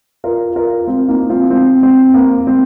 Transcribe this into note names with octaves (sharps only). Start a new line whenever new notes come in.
F4 A#4
F4 A#4
C4 F4
A#3 D#4
C4 F4
C4
C4
A#3
C4